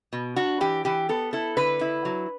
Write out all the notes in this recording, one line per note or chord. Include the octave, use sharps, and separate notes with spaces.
B2
D4 F#4
E3 G4
E3 G4
B3 A4
E4 A4
D3 B4
E4
F#3